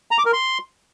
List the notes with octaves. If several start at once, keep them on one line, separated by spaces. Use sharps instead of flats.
A#5
D6
A#4
C6